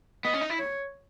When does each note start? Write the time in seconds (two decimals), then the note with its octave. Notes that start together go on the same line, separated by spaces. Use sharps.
0.24 B3 D#5
0.33 C#4
0.41 D#4
0.50 E4
0.59 C#5